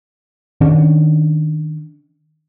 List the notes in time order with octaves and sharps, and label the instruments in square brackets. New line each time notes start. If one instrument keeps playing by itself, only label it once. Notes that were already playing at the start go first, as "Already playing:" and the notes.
[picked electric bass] D#3 C#4 D4